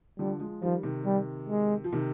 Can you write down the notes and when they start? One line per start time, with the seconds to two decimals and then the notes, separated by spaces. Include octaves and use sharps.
0.19 D3 F3 G3
0.40 F3 G#3
0.62 D#3 F3 G3
0.83 C3 D#3
1.05 G3
1.49 G#3
1.84 F3
1.93 C3 D#3